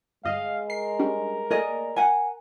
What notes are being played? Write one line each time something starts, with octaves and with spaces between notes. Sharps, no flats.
G1 G#3 D#5 F5
A#4 C7
G3 C#4 D4
A3 A#3 G#4 D5 D#5
F#5 G#5